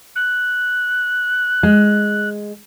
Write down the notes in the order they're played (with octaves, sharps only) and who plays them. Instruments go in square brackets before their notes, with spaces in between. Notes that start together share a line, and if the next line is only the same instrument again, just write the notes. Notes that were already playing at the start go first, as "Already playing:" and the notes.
[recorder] F#6
[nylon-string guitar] G#3